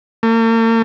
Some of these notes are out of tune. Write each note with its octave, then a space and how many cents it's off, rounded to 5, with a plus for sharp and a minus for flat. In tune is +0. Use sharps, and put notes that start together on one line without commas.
A#3 -45